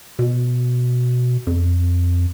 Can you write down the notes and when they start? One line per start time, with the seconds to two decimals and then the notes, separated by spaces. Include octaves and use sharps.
0.19 B2
1.47 F2